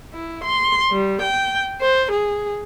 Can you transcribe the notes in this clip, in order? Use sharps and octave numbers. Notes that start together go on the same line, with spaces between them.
E4
C6
G3
G5
C5
G#4